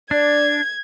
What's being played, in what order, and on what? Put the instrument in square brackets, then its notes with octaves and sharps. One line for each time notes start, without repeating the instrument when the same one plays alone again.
[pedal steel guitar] D4 [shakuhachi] D5 [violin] G#6